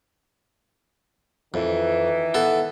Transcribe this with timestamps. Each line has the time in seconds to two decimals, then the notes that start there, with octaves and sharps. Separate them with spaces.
1.54 F2 D#3 E3
2.34 B3 A4